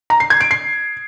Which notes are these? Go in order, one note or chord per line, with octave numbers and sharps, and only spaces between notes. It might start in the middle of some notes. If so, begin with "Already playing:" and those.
A#5
C7
G#6
D7
C7